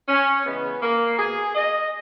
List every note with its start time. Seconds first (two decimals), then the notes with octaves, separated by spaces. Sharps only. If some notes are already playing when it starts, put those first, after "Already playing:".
0.08 C#4
0.45 C#3 E3 G#3 B3
0.82 A#3
1.19 B2 A#3 G#4
1.55 D#5